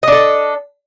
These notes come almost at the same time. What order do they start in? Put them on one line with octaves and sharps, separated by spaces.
D#5 D4 A4